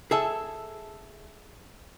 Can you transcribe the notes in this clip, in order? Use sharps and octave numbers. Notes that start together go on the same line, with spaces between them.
G#4 A4 E5